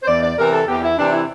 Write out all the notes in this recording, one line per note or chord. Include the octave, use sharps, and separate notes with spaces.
C5
E2 D5
D5
C3 E3 A#4
A4
E2 G4
E4
C3 E3 D4
E4